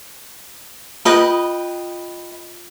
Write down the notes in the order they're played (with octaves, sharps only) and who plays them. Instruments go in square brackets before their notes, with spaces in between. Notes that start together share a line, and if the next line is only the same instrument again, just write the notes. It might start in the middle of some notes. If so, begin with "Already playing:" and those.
[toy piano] F4 [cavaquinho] B4 D#5 G5